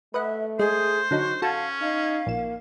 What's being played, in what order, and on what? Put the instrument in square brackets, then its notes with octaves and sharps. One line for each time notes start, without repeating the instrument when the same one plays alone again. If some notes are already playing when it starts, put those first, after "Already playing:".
[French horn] A3 [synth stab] B4 D#5 F#5 [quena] E5
[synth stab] G#3 [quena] G#4 [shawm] C5
[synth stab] D3 F#3 D#4 [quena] F#4
[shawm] C#4 [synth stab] F#4 A4 A5 [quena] F5
[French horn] D#4 [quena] F5
[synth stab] A#1 E7 [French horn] A#3